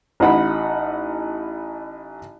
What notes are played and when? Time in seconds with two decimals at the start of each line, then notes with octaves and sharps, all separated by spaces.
0.20 A1 D#4 F#5 B5